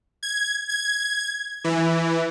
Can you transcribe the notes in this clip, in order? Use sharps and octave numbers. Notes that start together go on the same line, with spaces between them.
G#6
G#6
E3